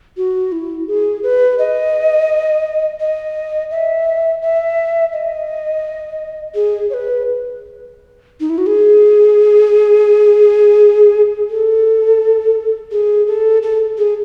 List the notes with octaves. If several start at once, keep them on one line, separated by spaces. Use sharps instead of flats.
F#4
E4
G#4
B4
D#5
D#5
E5
E5
D#5
G#4
C#5
B4
D#4
E4
F#4
G#4
A4
G#4
A4
A4
G#4